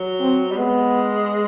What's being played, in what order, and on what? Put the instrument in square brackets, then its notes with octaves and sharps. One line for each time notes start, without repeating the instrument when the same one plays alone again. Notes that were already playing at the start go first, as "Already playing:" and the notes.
Already playing: [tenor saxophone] F#3
[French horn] C4
[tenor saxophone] G3
[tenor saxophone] G#3 [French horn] B3